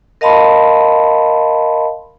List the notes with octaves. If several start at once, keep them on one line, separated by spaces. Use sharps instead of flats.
A#4 D#5 F5 A5 B5 C6